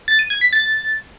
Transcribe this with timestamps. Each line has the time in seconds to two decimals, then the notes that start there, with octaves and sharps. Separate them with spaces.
0.08 A6
0.19 D#7
0.30 G#6
0.41 B6
0.53 A6